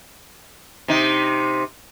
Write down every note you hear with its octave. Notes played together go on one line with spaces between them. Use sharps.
C3 D#4